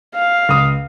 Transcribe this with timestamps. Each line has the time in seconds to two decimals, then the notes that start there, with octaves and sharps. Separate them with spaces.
0.15 F5
0.49 C#2 D#6